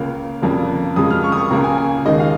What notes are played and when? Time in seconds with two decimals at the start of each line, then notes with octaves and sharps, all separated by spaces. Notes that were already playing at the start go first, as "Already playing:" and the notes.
Already playing: C#2 C#3 A#3 F5
0.42 F1 F2 C#3 A#3
0.96 F2 C#3 G#3 D#6
1.10 F6
1.24 C#6
1.32 D#6
1.37 C#6
1.50 C#2 C#3 A#3 A#5
1.64 G#5
1.78 G#5
2.05 D#2 D#3 G#3 D#5
2.20 F5